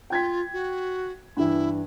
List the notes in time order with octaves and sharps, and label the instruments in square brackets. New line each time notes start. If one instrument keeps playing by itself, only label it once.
[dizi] F4 [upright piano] G5 G#6 B6
[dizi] F#4
[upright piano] G2 E3 [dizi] E4